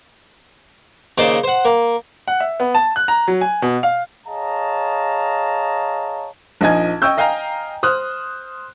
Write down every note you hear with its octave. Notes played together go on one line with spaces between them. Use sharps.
D#2 C#3 C5 D5 D#5 D6
C5 F#5
A#3
F#5
E5
B3
A5
F#6
A#5
F#3
G#5
B2
F5
G#4 C#5 D#5 F5 A5 A#5
A#1 F3 D#4 D#5 G#5 G#6
D#5 G5 C#6 E6 G6
D#5 F5 G5 G#5 A#5
C5 D#6 F6 F#6